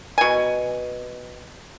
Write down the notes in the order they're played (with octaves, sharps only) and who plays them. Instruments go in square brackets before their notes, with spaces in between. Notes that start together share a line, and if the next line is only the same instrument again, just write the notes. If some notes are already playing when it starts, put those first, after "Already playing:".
[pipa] B2 G#5